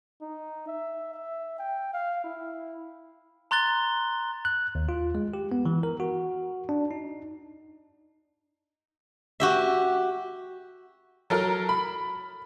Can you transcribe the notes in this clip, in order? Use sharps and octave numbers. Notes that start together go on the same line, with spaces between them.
D#4
E5
E5
G5
F5
E4
A#5 C6 F#6 A6 G7
F#6
D#2
F4
G#3
G4
B3
E3
A#4
F#4
D4
D#4
F#4 G4 E5
F#3 A4 A#4 F6
B5